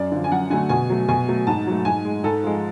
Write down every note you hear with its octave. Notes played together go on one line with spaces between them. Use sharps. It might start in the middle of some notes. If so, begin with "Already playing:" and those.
Already playing: F#2 D5
D3 F3
G#5
F#2 F#5
D3 F#3 A3 G#5
B2 G#5
F#3 A3
B2 G#5
F#3 A3
G#2 A5
F#3 A3
G#2 G#5
G#3
G#2 A4
F3 G#3